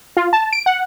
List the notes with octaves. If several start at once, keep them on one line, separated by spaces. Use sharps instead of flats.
F4
A5
D7
F#5